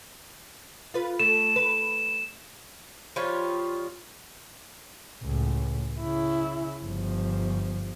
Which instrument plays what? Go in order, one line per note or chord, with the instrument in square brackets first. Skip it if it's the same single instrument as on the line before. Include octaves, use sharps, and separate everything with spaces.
[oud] F4 B4
[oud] A3 [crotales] E7
[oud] B4
[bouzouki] F3 G3 F4 C#5
[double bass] C#2 A2
C#3 E4
G1 F3